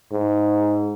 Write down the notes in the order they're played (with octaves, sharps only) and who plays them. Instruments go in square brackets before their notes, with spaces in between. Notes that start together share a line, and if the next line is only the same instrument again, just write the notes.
[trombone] G#2